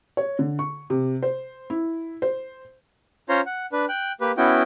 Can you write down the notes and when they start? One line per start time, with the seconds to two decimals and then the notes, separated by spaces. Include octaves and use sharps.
0.17 C#5
0.39 D3
0.59 C#6
0.90 C3
1.23 C5
1.70 E4
2.22 C5
3.29 C#4 F4 C5 C#5 A#5 C6
3.46 F#5
3.72 D4 B4
3.89 G5 F#6
4.21 A#3 G4 B4
4.38 B3 C#4 E4 F#4 G5